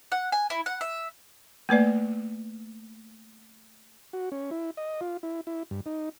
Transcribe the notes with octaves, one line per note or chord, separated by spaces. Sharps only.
F#5
G#5
E4
F#5
E5
A3 A#3 B4 D5
F#4
C#4
E4
D#5
F4
E4
E4
G2
D#4